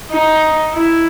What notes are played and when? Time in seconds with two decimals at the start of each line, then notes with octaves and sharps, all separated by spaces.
0.11 D#4
0.73 E4